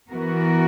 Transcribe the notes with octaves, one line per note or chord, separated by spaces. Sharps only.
E3 B3 F#4 A#4